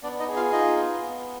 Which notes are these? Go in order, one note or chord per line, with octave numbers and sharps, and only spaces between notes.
B3 D4 D5
D#4 D#5
G#4
F4 F5
D#4 F4 D#5
B3
B3